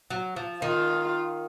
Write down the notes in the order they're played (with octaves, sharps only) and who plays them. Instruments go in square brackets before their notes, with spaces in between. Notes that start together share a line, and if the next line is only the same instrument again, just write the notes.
[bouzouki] F#3
F3
[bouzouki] D#3 [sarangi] F4